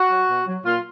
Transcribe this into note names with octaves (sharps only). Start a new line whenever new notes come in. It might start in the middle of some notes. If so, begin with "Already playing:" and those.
Already playing: F#4
F#3
B2
F#3
A#2 F4